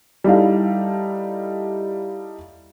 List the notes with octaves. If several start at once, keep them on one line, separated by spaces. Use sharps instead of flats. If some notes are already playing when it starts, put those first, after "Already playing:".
G3 D#4 E4 A4 F5